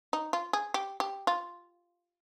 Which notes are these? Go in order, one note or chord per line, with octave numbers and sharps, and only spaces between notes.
D#4
F4
G#4
G4
G4
F4